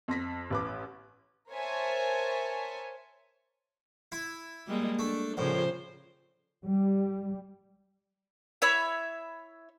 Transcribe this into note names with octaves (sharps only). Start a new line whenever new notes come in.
F2 C6 A#6 B6
A1 B4 D6
A#4 C5 C#5 E5 G#5 A5
E4
G3 G#3 A#3
A3 D4
A#1 A2 C#3 F4 C5
G3
E4 C#5 E5 B5